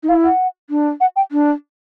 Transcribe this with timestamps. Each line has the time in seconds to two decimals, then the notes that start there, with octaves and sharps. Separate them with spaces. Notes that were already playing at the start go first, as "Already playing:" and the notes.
0.03 D#4
0.09 E4 F5
0.24 F#5
0.70 D4
1.01 F#5
1.16 G5
1.32 D4